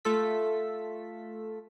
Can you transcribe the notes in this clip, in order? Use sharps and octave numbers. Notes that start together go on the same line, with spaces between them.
A3 F4 A4 B6